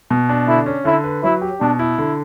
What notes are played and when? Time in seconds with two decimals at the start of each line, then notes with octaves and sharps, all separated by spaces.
0.11 B2
0.29 D4
0.48 D3 E4
0.66 C#4
0.85 D3 E4
1.04 B4
1.23 F#3 E4
1.42 G4
1.60 B2 D4
1.79 E4
1.98 D3